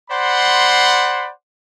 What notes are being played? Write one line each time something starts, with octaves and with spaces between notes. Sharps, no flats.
C5 D5 F#5 B5 C6